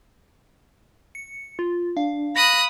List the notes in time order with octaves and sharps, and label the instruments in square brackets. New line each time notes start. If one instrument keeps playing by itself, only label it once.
[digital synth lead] C#7
F4
[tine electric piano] D4 [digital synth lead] F5
[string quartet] B5 D#6 F#6 [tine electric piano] A#6